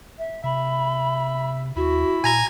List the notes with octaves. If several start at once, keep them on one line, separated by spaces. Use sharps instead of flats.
E5
C3 E5 B5
D#2 E4 F#4
A#2 G#5 A#5 G#6